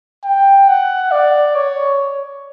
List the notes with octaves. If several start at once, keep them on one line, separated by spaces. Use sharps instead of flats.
G5
F#5
D5
C#5